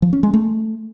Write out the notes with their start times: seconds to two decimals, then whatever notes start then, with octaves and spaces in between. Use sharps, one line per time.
0.02 F3
0.13 C#4
0.23 G#3
0.34 A3